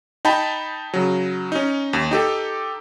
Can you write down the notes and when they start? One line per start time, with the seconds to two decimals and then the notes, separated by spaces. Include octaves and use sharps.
0.25 D#4 G5 A5 B5
0.94 C#3 F#3
1.52 C#4 D#4
1.93 D#2
2.11 D#4 G4 A4